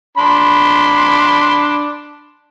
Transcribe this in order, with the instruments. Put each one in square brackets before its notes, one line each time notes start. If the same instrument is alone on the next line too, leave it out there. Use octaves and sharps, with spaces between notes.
[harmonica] D4 B5 C6